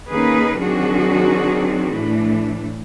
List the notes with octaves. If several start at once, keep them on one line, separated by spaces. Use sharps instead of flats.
D#3 A#3 C#4 D#4 G#4 B4
D#3 F#3 C4 D4 F#4 G#4
A2 E3 A3 D4